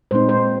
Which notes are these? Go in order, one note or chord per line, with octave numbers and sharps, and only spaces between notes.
A#2 G#3 C4 D#4 C5
C5